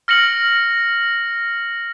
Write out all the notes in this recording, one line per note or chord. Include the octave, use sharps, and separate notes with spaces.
F6 A#6 C#7 F#7